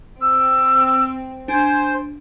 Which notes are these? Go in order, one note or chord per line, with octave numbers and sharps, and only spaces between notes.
C4 E6
D4 C5 G#5